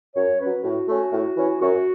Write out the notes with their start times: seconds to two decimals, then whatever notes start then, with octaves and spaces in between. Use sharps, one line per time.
0.14 F#2 C#5
0.38 F#3 C#4 B4
0.63 A2 F#4
0.87 A3 C#4
1.12 A2
1.35 E3 C#4
1.60 F#2 F#4